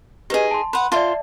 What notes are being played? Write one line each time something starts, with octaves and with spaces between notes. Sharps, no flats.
D#4 G4 G#4 B4 D#5
A5 C6
B4 F#5 B5 C6
F4 C5 D5 E5 A5